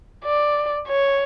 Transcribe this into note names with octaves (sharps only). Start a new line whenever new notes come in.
D5
C#5